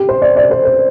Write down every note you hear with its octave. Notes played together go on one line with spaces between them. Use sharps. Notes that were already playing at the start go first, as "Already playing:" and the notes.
Already playing: G4
C5
D5
D5
C5
C5